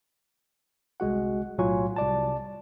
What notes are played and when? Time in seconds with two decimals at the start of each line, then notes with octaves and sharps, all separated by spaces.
1.00 G1 C2 G#3 F#4 F#5
1.58 B1 A2 F#3 F4 G#5 C#6
1.96 C2 D5 A5